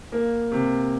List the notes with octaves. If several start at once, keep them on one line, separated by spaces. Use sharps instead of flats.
A#3
C3